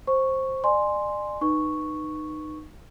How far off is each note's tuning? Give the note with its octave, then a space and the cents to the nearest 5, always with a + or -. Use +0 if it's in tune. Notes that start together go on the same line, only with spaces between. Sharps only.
C5 +10 C#6 +0
D5 +40 G#5 +0 C6 +0
D#4 -20 B4 +0 C#6 +0